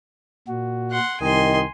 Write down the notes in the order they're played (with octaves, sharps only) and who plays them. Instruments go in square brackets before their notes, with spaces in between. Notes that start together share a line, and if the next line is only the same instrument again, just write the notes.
[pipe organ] A#2 F#4
[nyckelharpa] F#5 C6
[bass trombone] C2 [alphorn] D#3 [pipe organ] D#5 [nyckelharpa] G#5 C6